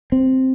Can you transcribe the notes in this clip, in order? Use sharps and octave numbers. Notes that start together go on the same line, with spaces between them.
C4